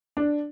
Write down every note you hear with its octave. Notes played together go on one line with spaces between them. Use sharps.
D4